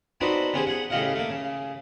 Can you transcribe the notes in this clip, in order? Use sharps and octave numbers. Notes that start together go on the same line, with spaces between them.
B3 C4 D4 D#4 F#4 B4
B3 C#4 G4 G#4 C5
G#4 F#5
A2 C#3 G4 D#5 F5 F#5
A3 A#3
C#3